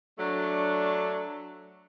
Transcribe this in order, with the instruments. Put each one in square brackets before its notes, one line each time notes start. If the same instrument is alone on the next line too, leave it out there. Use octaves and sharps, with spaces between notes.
[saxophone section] F#3 A3 D4